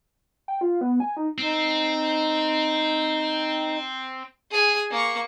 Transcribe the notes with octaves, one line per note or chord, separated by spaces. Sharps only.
G5
F4
B3
G#5
D#4
C4 D#4
G#4 G#5
A#3 C#6